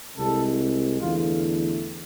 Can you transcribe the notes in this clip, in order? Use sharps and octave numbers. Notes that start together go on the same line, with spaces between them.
C2 C3 G#3 A4
E2 D3 A3 F4